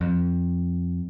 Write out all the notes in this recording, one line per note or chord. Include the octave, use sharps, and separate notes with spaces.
F2